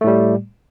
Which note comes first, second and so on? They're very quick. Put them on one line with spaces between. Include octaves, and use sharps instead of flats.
A3 A2 G3